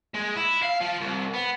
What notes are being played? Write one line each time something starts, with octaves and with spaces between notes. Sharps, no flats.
G#3
E4
F5
F3
C2
B3